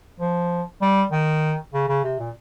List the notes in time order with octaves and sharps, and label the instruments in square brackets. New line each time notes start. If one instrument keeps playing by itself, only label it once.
[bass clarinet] F3
G3
D#3
C#3
C#3
C3
A#2